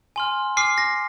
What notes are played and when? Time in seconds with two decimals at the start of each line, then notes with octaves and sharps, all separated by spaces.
0.16 G#5 C6 F6
0.57 G#5 D6 F6 C7
0.78 A#6